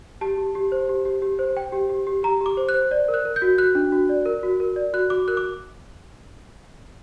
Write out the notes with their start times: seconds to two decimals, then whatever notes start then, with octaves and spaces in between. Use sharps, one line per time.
0.21 G4 A5
0.37 G4
0.55 G4
0.72 C5
0.89 G4
1.05 G4
1.22 G4
1.39 C5
1.57 C5 G5
1.72 G4
1.90 G4
2.07 G4
2.23 G4 A#5
2.41 G4
2.46 D6
2.57 C5
2.69 F#6
2.74 C5
2.91 D5
3.08 A#4
3.14 F#6
3.25 A#4
3.36 G6
3.42 F#4
3.58 F#4 F#6
3.75 D4
3.92 F#4
4.09 D5
4.26 A#4
4.43 F#4
4.60 A#4
4.76 D5
4.93 F#4 F#6
5.10 F#4 D6
5.28 A#4 F#6
5.37 D6